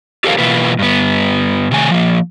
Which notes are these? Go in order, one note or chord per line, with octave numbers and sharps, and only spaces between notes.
F4 G4 A4 A#4 C5 F5
B2 E3 A#3 F4 B4
G2 B3
C3 D#3 A3 G#5
F3 A#3